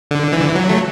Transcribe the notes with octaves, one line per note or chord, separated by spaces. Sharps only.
D3
E3
D3
E3
F#3
A3